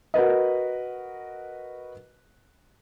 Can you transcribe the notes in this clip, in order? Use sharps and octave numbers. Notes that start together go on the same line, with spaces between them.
F#4 A#4 B4 D#5